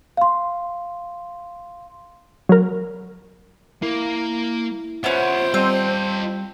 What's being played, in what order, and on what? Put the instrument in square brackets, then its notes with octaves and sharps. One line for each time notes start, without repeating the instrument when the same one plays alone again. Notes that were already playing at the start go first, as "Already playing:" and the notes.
[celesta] F5 C6
[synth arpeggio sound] F#3 A#4
[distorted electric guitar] A#3 [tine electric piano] E4
[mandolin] B3 C#4 [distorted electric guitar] F4 E5 [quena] C5
[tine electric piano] G3 [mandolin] C4 [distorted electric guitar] F4 D#5